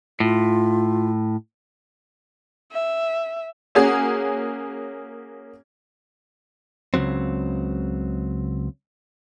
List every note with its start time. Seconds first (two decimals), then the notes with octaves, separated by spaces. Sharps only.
0.20 A2 F4
2.72 E5
3.75 A#3 C#4 F#4 G#4
6.94 C#2 F#2 C#3 F#3 C4